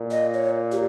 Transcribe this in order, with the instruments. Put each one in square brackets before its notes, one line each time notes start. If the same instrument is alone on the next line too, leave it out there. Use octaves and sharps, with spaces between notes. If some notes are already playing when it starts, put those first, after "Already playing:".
Already playing: [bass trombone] A#2
[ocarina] D#5
C#5
G4